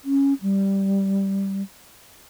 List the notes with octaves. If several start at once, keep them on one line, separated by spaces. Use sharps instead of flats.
C#4
G3